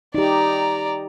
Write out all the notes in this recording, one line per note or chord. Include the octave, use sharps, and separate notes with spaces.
D#4 G4 D5 A#5